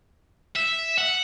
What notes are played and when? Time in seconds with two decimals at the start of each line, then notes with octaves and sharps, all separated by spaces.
0.56 E5
0.98 F#5